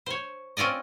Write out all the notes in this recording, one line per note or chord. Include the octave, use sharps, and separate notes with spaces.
C5 C#5
C4 C#4 F4 D5 D#5